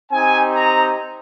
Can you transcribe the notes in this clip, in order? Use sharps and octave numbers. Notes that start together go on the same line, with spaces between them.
C4 D#4 G4 G#5
A#5